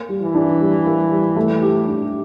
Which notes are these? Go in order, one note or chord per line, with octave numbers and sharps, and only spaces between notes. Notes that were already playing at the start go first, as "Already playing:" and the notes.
Already playing: A#3
G3
E3
D4
G3
A#3
G3
A3
G4
D4